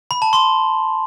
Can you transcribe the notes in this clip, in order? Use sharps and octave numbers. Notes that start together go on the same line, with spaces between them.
B5
A5
C6